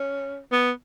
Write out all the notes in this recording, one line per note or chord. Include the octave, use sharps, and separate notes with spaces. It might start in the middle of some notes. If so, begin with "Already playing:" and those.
Already playing: C#4
B3